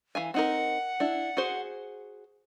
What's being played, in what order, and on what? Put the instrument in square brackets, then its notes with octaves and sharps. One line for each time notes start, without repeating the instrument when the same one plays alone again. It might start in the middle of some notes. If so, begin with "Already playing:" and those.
[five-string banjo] E3 F5 G#5
[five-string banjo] C4 D#4 A#4 [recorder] F#5
[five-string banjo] D4 E4
F#4 G#4 C5